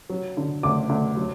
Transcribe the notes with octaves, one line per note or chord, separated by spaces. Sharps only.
F#3
D3
D2 D6
D2
F#3